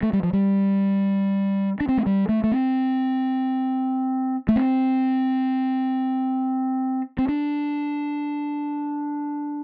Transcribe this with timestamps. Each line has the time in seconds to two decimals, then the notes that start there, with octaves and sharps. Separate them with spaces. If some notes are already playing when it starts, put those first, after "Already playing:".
0.03 A3
0.13 G3
0.23 F3
0.33 G3
1.80 D4
1.89 C4
1.97 A3
2.06 G3
2.29 A3
2.44 A3
2.52 C4
4.49 A3
4.56 C4
7.18 C4
7.28 D4